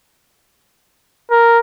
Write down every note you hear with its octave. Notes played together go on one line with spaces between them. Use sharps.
A#4